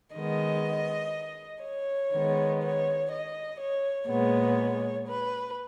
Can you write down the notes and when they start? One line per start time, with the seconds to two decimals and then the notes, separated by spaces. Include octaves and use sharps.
0.15 D#3 G#3 B3 D#5
1.63 C#5
2.12 D#3 G#3 B3
2.62 C#5
3.11 D#5
3.59 C#5
4.09 A#2 G#3 B3 C#5
5.07 B4